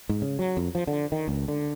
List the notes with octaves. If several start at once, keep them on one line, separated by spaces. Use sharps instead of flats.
G#2
C#3
F#3
F2
F3
D3
D#3
C#2
D3